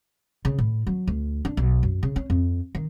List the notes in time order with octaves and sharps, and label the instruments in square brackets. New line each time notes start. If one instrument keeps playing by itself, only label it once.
[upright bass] C#3
A2
F#3
D2
D4
B1
F#2
C#3
C#4
F2
D#3